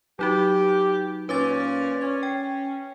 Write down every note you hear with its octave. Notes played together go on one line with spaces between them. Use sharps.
F#3 D#4 F#4 G4
A#2 C#4 B4 D6 A6
C#4
G5